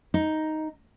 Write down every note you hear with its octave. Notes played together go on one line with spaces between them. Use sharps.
D#4